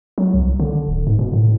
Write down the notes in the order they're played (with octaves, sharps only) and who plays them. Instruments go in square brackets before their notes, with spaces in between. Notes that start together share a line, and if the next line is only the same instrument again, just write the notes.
[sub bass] F#3
C2
D3
D1
G#2
B2
A2